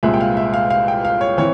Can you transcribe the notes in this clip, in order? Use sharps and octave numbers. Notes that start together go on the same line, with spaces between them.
C2 A#2 G#3 E5
G5
F5
E5
F5
F5
G5
F5
C#5
E3 C4 C#5